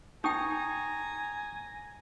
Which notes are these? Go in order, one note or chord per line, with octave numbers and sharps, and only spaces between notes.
D#4 G5 G#5 A#5 C#6 D#6 G6